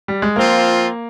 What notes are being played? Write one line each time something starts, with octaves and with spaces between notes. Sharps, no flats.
G3
G#3
F3 A#3 C4 F4